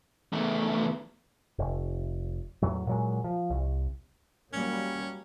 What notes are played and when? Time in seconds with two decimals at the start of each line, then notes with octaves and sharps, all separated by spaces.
0.33 E2 A3
1.59 F1
2.62 E2 A2 F#3
2.87 A#2 F#3 G#3
3.24 F3
3.50 C2
4.53 F#3 G3 A#3 C#4